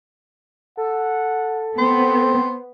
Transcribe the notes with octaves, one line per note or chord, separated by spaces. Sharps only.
A4 F#5
B3 C4 C5